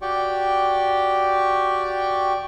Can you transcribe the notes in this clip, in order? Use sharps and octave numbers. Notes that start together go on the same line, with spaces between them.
F#4 G4 D5 G5 C#6